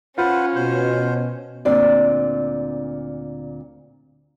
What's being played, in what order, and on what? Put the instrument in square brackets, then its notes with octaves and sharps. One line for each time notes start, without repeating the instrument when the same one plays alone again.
[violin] C#4 [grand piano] F4 [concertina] B4 C5 F#5
[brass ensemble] B2 [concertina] C5
[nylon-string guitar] D2 A#2 C4 D4 D5